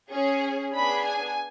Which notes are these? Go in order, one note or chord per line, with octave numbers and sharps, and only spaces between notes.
C#4 G#4
B3 D4 G#4 B5
G#5